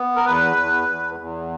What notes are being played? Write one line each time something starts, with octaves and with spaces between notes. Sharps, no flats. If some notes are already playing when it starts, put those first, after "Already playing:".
Already playing: B3
A#4
E2 B4
E2
E2
E2